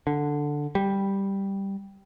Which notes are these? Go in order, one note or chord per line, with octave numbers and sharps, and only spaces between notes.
D3
G3